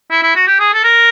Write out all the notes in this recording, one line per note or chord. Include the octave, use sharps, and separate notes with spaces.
E4
E4
F#4
G4
G#4
A4
A#4